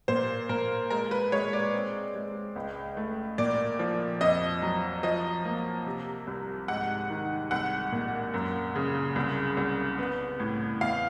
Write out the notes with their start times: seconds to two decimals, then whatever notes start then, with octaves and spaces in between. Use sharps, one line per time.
0.08 A#2 C5
0.49 A#2 A#4
0.91 G#3 A#4
1.11 B4
1.32 G#3 C#5
1.53 D5
1.74 C4
2.15 G#3
2.56 C#2
2.97 A3
3.38 A#2 D5
3.79 F3
4.21 F2 D#5
4.62 F#3
5.03 F3 D#5
5.45 A#3
5.86 C3
6.27 C2
6.68 G#2 F#5
7.10 D#3
7.51 C2 F#5
7.92 A#2
8.34 F#2
8.75 C#3
9.16 C2
9.57 C2
9.99 B3
10.40 A2
10.81 E2 F5